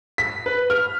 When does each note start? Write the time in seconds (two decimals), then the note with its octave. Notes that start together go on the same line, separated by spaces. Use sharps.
0.18 B6
0.46 B4
0.70 F6